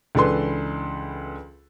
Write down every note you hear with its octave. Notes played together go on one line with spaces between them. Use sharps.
C#2 E3 D4 A4 B4 C6